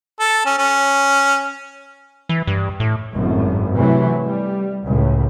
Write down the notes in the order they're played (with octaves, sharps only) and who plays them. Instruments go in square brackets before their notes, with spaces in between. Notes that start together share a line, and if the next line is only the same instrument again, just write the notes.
[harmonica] A4
C#4
C#4
[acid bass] E3
G2
A2
[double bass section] G#1 F#2 A2
C3 E3 F#3 A3
G3
C#2 A2